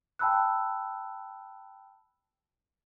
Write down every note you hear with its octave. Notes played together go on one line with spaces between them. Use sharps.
G5 A5 B5 E6 F#6